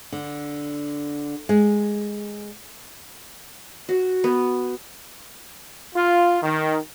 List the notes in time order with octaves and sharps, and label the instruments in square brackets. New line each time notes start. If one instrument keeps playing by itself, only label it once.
[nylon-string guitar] D3
G#3
[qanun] F#4
B3
[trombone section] F4
D#3